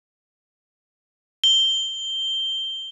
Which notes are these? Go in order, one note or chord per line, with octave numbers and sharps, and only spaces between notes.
G7